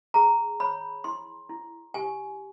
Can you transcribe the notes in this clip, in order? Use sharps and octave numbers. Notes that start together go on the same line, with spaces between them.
G#4 A#5
C#5 B5
E4 C6
E4
G4 G#5